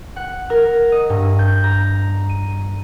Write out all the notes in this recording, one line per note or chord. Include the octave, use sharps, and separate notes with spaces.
F#5
A#4
D#5
G2
G6
A#5
D#7